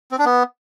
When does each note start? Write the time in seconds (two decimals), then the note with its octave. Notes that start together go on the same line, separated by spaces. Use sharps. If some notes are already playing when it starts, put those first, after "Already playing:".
0.12 C4
0.19 D4
0.25 B3